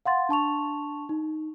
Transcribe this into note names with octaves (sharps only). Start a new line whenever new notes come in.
F5 F#5 C6 A6
D4 A5 C#6 F7
D#4